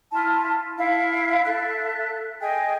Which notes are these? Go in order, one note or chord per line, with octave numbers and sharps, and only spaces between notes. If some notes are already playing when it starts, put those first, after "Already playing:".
E4 F4 A5
E4 F5
A4 E5 F#6
G#4 D#5 G5 G#5